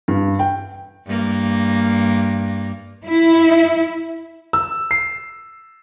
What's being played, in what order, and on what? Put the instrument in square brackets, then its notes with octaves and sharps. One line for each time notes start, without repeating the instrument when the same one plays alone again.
[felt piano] G2
G5
[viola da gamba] G2 A#3
[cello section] E4
[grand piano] E6
C7